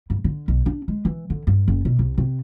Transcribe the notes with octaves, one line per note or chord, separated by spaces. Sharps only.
G2
D3
B1
D4
G#3
E3
D3
G2
F#1
B2
C2
C3